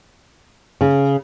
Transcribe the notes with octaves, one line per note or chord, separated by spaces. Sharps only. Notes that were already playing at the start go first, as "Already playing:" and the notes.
C#3